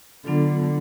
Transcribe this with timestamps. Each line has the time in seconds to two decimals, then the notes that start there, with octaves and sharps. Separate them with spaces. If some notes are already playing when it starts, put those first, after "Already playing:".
0.25 D3 F#3 B3 D4 F4 A4